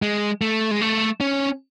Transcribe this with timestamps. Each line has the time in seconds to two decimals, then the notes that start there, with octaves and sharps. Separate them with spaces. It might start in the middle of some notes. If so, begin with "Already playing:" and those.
0.02 G#3
0.41 A3
0.71 G#3
0.81 A3
1.21 C#4